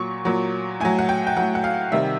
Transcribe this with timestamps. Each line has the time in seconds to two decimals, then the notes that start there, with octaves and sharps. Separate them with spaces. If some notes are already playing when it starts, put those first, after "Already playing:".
Already playing: A#2 F#3 C#6
0.25 A#2 F#3
0.80 A2 F#3 G#5
0.99 F#5
1.09 G5
1.27 G5
1.37 A2 F#3 F#5
1.55 F#5
1.64 F5
1.92 C3 D#3 G3 E5